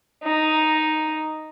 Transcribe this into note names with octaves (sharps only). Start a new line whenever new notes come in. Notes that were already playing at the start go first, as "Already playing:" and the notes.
D#4